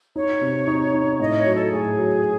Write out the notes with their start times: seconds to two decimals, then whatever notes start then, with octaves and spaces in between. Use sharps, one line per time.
0.16 D#4 C#5
0.41 C3
0.67 D#4
0.94 D#4
1.19 A2 D#5
1.37 C#5
1.46 F#3
1.55 A4
1.72 A2 G#4
1.98 F#3